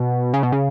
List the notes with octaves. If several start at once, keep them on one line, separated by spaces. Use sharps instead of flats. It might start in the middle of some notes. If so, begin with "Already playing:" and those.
Already playing: B2
C#3
B2
C#3